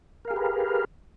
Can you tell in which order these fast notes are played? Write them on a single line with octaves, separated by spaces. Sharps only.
A#4 F5 G#4 G4 B4